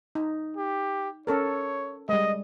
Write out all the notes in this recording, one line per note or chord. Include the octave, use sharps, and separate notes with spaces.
D#4
G4
C#4 A4 A#4 C#5
G3 G#3 D#5